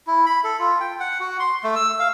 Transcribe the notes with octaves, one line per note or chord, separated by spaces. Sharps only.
E4
B5
A4
F4
G5
F#5
F#4
C6
A3
E6
F5